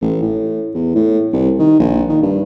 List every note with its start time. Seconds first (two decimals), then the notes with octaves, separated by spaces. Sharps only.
0.02 A1
0.22 A2
0.74 E2
0.95 A2
1.33 C2
1.59 D#3
1.80 A#1
2.09 D#3
2.23 G2